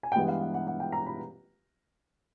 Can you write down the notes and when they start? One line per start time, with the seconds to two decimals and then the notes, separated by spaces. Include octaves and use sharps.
0.03 G#5
0.12 G5
0.16 G2 E3 G#3 B3 F#5
0.28 F5
0.41 F#5
0.54 F#5
0.67 F#5
0.80 G5
0.92 A#5
1.06 B5